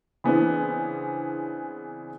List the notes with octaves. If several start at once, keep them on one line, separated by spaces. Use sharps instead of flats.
C#3 E3 B3 C4 D4